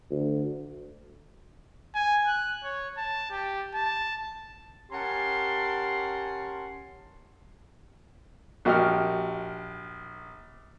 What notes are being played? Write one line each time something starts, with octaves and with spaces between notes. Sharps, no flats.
D2
G#5
F#6
C#5
A5
G4
A5
C#4 G4 A#4 F#5 A5 C6
A#1 F#4 G4 D#5 F6